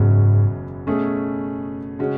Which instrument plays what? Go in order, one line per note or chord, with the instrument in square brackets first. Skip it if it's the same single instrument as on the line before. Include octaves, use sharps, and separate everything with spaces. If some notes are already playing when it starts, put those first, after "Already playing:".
Already playing: [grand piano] F#1 E2 B2 F#3 C#4 [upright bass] G#2
[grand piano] B2 A3 C#4 G#4
C#3 G#3 C#4 F#4